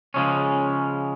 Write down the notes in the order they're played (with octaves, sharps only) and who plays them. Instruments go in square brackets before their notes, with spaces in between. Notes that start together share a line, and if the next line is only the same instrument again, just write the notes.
[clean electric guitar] C#3 F3 G#3 C#4